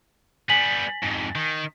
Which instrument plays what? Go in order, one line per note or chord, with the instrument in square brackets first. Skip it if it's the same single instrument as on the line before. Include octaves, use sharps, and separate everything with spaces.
[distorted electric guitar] G3 B3 [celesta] G#5 B6 F#7
[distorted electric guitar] F2 G#2
D#3